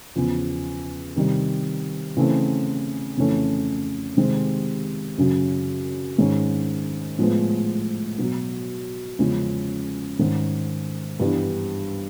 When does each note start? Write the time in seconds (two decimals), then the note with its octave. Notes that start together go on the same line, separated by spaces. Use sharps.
0.16 E2 C#3 F3
1.16 C3 D#3 G3
2.17 C#3 E3 A3 C4
3.17 F2 C#3 E3 A3 C#4
4.17 C3 D#3 G#3 C4
5.18 F#2 C#3 F#3
6.18 G#2 D#3 G#3 C#4
7.18 A2 F3 G#3 B3
8.18 B2 F#3 B3
9.18 E2 C#3 F3 G#3 C#4
10.19 G#2 D#3 G#3 C#4
11.20 G2 E3 G3 B3